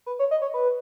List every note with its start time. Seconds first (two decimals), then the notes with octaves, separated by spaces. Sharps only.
0.06 B4
0.19 C#5
0.31 D#5
0.42 C#5
0.54 B4